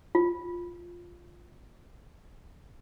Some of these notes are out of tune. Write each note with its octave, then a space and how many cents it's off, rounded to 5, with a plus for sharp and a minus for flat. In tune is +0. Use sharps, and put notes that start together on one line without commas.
F4 +0